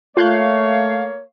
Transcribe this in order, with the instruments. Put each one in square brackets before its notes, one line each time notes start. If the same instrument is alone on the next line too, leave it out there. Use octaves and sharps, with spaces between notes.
[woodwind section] A3 [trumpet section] A#3 C#5 [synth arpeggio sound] F4 F#6 G6 [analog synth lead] F5